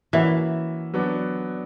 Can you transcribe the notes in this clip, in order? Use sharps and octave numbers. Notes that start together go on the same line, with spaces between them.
E3 A#3 C#4 F#4 B4 E5
F#3 B3 D4